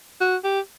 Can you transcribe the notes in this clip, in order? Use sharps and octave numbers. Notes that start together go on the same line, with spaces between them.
F#4
G4